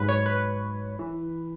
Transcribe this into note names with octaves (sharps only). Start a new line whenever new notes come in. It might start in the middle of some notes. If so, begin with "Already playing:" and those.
Already playing: G#2 F#3 B4
C#5
B4
E3